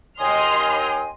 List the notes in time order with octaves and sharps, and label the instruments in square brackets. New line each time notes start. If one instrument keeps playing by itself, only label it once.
[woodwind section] D#2 G5 G#5 [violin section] D#5 C6 F6 [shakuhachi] D#6